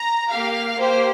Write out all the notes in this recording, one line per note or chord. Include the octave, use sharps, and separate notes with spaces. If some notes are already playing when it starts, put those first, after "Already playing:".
Already playing: A#5
A#3 G4 F5
A#3 G4 C5